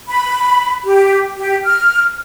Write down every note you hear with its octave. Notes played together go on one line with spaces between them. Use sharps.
B5
G4
G4
F6